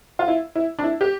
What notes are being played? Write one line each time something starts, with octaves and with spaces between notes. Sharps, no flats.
F4
E4
E4
D4
E4
G4